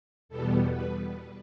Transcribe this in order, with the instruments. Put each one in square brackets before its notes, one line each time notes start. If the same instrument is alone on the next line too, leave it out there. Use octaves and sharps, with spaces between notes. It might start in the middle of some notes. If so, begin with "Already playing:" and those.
[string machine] E2 B2 G3 B3 A4
B4